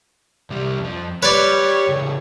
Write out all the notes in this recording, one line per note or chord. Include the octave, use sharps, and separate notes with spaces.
C2 G3
F2 F3
G3 B4 C#5 D5
A2 C#3